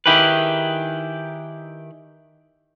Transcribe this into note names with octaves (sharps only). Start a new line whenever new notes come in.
D#3 E4 G4 G#4 B4